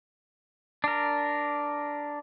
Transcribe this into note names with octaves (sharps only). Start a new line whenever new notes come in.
D4 A#4